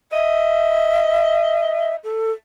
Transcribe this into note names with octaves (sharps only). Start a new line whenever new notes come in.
D#5 E5
A4